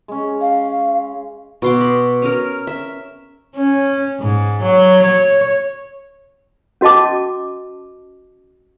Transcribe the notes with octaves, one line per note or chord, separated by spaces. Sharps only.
G#3 C#4
F5
B2 C6 D6
B5
C#4 A#4
E5
C#4
G#2
F#3
C#5
C#4 F#4 D#5 A5 D6